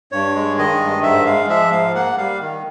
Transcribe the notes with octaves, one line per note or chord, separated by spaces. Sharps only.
G2 C#5
G#3
D#3 D#5
G2
G#2 E5
G#3 F5
F3 E5
G#2 F5
A#3 F#5
G3 F5
D#3